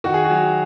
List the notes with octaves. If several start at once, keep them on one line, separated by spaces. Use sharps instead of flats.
D#3 F#4
G#4
F#4
F#3